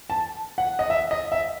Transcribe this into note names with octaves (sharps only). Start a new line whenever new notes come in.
A5
F#5
D#5
E5
D#5
E5